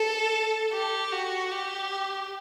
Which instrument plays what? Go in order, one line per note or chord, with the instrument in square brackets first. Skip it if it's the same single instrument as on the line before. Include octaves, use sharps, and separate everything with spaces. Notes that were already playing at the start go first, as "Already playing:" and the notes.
Already playing: [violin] A4
G4
F#4
G4